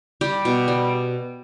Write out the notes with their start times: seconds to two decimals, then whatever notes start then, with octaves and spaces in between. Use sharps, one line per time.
0.21 G3 G4
0.45 B2
0.68 G3